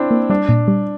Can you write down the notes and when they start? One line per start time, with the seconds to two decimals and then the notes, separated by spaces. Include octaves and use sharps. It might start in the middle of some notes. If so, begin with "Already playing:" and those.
Already playing: C4 D4 E4
0.11 A#3
0.30 G3 D4
0.49 A#2
0.68 G3